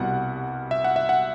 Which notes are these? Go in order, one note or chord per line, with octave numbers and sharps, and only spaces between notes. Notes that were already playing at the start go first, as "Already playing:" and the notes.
Already playing: C2 B2 G3 F#5
E5
F#5
E5
F#5